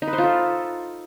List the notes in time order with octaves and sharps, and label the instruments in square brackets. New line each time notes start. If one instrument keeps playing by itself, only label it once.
[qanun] D#4
B4
C5
F4
A4